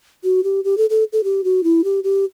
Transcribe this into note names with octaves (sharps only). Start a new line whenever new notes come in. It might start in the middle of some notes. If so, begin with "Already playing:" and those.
F#4
G4
G4
A4
A4
A4
G4
F#4
E4
G4
G4